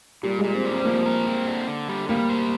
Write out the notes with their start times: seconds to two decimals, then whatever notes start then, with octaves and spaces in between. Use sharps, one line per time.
0.23 A#2 G3
0.39 G#3
0.44 A#2
0.55 C4
0.65 G3 C4
0.80 C4
0.85 F3 A#3
1.06 A#4
1.27 C4
1.47 D3
1.67 D3
1.89 G3
2.09 G3 A#3
2.29 C5